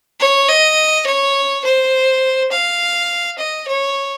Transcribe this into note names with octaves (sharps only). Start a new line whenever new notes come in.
C#5
D#5
C#5
C5
F5
D#5
C#5